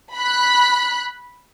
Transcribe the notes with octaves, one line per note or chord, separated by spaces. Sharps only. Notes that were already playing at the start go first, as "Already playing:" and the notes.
B5 F#6